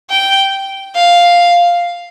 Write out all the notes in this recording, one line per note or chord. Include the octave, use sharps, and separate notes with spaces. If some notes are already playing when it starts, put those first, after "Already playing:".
G5
F5